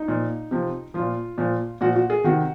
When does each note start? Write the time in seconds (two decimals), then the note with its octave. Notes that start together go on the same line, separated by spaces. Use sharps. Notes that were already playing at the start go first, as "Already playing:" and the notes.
Already playing: D#4
0.08 A#2 F3
0.51 C3 F3
0.94 A#2 F3 F4
1.38 A#2 F3
1.81 A#2 F3 F#4
1.96 F#4
2.10 G#4
2.24 C3 D#3 F#4